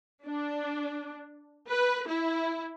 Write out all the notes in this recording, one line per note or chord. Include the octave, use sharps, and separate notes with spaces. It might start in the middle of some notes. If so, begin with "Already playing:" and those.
D4
B4
E4